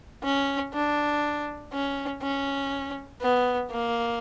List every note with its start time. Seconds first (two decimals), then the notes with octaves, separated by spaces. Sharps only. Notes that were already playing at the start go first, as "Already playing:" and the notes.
0.24 C#4
0.74 D4
1.73 C#4
2.22 C#4
3.21 B3
3.71 A#3